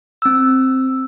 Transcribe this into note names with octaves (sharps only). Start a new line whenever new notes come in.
C4 E6